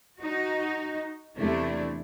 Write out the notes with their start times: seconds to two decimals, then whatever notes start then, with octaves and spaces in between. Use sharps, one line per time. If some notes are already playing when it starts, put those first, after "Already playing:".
0.19 D#4 F#4
1.38 E2 C3 A3 D4 E4